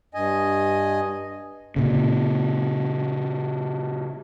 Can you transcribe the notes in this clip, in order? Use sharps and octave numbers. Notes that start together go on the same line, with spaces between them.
G2 D#5 G#5
A#2 C#3